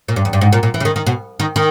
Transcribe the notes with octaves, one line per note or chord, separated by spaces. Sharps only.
A#2
G2
E2
G2
G#2
A#2
A#2
E3
C#3
D#3
D#3
B2
D#3
D#3